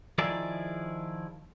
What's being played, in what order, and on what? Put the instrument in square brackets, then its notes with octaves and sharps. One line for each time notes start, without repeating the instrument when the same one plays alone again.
[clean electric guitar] D#3 F3 E4 G#4 D5